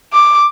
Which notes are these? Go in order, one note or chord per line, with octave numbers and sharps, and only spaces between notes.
D6